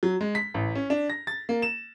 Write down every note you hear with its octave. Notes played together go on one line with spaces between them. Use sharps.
F#3
G#3
B6
A1
C#4
D4
A#6
A6
A#3
E7